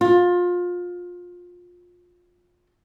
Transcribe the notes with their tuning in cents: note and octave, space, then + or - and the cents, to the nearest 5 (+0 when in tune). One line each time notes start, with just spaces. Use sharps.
F4 +25